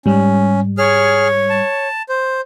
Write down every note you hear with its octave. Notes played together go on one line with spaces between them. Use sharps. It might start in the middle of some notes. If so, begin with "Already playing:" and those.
G#2 G3 C#4
G#4 C#5 F6
A5
C5